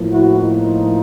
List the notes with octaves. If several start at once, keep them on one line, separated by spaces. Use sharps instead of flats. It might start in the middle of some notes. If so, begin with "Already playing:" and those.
Already playing: A2 F3 A#3
E4 F#4
D#4 F4